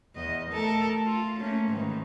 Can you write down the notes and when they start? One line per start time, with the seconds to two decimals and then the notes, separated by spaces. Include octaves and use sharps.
0.15 E2 D#5
0.51 A3 A4 A#4
1.06 F4
1.40 A3 A#3 C#4
1.69 G#2 D#3 E3